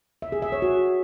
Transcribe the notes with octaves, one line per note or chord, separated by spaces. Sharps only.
E5
G#4
E5
C#5
F#4